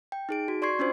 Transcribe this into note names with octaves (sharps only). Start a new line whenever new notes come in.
G5
D#4 G#4 D7
F#4
D5 C6 C#6 G#6 C7
C#4 D4 F4 C5